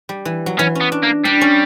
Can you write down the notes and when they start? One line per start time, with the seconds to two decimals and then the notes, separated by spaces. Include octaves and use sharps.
0.09 G3
0.25 E3
0.46 F#3
0.59 E3 C#4
0.75 C#4
0.81 B3
0.92 D4
1.03 A#3
1.25 G3 D4
1.41 C#4